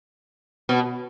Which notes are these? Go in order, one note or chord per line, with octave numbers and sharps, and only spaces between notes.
B2